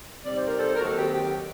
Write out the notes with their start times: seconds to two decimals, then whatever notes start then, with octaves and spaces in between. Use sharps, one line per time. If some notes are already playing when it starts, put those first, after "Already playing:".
0.24 C3 G3 C4 D#4 D5
0.36 C5
0.46 A#4
0.58 A4 C5
0.76 A#4
0.81 D#2 D#3 F#3 C4 F#4 A4
0.96 G4
1.10 G4